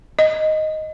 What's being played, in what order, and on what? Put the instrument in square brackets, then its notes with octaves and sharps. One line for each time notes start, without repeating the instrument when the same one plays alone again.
[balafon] D#5